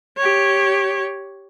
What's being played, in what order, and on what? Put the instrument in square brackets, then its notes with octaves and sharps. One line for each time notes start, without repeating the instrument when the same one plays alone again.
[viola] G4 C#5